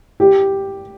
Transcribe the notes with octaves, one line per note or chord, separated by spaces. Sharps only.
G4